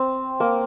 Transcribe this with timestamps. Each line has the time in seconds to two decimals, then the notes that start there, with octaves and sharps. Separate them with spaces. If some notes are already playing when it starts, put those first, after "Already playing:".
Already playing: C4
0.40 A#3